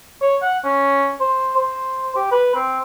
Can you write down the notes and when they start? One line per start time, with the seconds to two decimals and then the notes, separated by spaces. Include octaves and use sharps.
0.22 C#5
0.43 F#5
0.65 C#4
1.20 C5
1.57 C5
2.16 G4
2.32 B4
2.56 C4